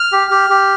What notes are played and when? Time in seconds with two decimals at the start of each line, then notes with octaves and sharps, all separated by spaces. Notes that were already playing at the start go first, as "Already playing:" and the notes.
Already playing: F6
0.12 G4
0.31 G4
0.50 G4